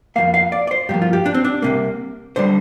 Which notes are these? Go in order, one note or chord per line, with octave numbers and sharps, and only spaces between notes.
F2 F3 A#3 F5
F5
D5
D5
C5
G2 F3 A#3 G4
F4
G4
D4
C4
D4
C2 C3 A#3
D3 G3 C5